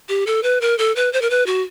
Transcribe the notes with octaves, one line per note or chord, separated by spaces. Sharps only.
G4
A4
B4
A#4
A4
B4
C5
A#4
B4
F#4